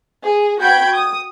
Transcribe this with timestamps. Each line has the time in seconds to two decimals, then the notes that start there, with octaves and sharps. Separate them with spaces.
0.23 G#4
0.60 F#4 G5 B5 G6 G#6 D7
0.94 D#6